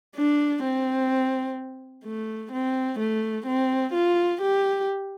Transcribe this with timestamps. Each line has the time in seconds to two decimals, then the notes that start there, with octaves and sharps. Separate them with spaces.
0.16 D4
0.64 C4
2.05 A3
2.52 C4
2.99 A3
3.47 C4
3.94 F4
4.42 G4